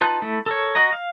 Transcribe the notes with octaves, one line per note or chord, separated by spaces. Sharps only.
D#4 F4 B4 A5 F#6
A3 E4
A4 A#4 C#5
F#4 D#5 A#5
F5